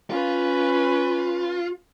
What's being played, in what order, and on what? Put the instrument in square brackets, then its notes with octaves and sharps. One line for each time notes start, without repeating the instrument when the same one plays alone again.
[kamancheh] C#4 B4 [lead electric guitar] F4